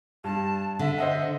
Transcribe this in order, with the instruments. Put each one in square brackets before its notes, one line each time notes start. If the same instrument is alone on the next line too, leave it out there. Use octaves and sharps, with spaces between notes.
[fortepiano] G2 [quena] A5
[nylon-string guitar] D3 [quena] E5
[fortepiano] C5 E5 F#5 [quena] D#5